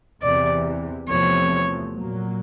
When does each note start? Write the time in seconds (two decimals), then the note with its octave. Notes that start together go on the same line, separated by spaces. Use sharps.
0.22 E2 C3 E3 D5
1.08 E2 C3 F3 A3 C4 C#5
1.94 A#2 F#3 A#3